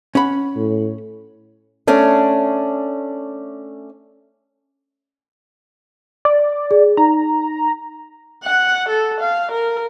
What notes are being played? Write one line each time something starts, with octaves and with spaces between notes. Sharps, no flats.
C#4 F#5 B5
A2
A3 C#4 D4
D5
G#4
D#4 A#5
F#5
A4
F5
A#4